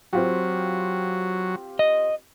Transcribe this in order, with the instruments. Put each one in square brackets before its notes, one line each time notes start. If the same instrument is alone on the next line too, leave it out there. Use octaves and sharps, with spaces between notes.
[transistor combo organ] F#3 [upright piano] C4 F4 G4
[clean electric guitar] D#5